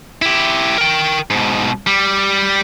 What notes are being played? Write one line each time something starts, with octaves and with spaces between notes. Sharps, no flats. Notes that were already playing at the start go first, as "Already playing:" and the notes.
E4 G4
A#4 G5
G#2 B2
G3